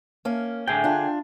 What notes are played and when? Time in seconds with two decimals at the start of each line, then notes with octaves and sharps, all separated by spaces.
0.25 A#3 C#4
0.67 A2 D3 G#4 G5
0.84 D4 F4